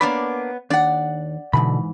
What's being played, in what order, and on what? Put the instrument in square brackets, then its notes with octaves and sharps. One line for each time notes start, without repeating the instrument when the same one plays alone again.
[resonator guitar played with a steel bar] A#3 D4 D5 [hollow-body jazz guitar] B3 C#5 B5
[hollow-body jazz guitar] D#2 D4 [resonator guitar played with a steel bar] D5 F#5
[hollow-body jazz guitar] G#2 E3 B5 [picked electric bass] B2 D3